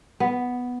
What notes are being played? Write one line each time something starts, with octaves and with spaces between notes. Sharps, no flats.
B3